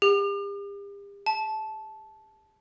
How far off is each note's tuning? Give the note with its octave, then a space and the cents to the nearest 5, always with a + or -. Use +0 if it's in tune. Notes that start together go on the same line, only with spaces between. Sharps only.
G4 +40
A5 -15